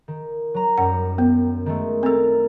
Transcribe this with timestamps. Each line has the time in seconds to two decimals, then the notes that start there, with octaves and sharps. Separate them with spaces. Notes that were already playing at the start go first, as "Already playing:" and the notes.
0.08 D#3
0.54 F#3 A#5
0.78 F#2 G3 F#5
1.18 B3
1.66 D#3 G#3 A3
2.03 C4 A4 A#4 A6